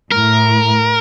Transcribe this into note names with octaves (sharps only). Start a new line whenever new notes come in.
A2 A#4